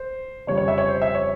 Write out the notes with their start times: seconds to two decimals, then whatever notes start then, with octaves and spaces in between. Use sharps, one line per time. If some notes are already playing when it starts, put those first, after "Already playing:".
Already playing: C5
0.47 F2 C#3 G3 C#5
0.58 C#5
0.68 E5
0.78 C#5
0.88 C5
1.02 E5
1.15 C#5